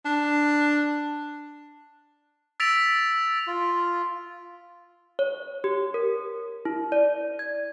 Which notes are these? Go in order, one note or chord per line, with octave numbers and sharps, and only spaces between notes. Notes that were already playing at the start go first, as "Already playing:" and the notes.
D4
E6 A6 B6 D7 F7
F4
C#5
G4
A#4
E4
D5
G#6